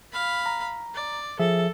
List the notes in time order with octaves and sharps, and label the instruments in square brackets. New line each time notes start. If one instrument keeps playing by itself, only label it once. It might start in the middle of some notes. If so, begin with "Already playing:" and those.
[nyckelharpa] F5 B5
[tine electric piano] A#5
[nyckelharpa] D5
[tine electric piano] F3 G#4 E5 [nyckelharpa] A4